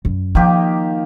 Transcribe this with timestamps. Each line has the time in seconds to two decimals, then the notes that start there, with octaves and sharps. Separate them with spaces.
0.05 F#2
0.35 D#3 F3 A#3 G4